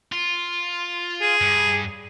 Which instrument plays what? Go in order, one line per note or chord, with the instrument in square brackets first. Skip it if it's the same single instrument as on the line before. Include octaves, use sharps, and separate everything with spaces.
[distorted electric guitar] F4
[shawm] G#4
[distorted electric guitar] G2